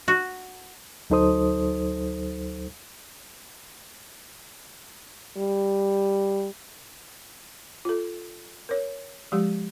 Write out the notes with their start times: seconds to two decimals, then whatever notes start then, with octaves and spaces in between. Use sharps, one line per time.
0.08 F#4
1.10 D2 F#3 D#4 A4 C5 D#6
5.38 G3
7.85 F4 A4
8.69 A#4 C#5
9.32 F3 G#3 G4